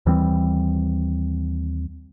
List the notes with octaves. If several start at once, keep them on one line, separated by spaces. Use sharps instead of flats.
D#2 E3 G3 C4